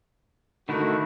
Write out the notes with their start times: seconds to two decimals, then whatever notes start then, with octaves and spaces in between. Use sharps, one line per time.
0.69 D3 D#3 A3 E4 F#4